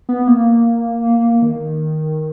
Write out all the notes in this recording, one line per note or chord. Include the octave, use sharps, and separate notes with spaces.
B3
A#3
D#3